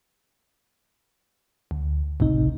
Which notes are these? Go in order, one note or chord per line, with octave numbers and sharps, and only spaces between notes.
D2
G#1 C#2 A2 C3 D#4